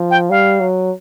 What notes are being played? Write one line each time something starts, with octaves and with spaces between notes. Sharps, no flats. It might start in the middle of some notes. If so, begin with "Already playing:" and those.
Already playing: F3
G5
G3 F5
F#3